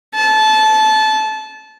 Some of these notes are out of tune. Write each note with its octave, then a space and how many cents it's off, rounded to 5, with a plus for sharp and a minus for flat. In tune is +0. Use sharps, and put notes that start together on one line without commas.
A5 -20